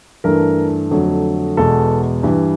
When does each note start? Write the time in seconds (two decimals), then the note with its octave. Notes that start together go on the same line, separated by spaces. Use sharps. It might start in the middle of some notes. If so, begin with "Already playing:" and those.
0.24 G2 E3 A3 A#4
0.91 F2 D3 F#3 A3
1.57 E2 B2 G#3 A4
2.23 G2 E3 G3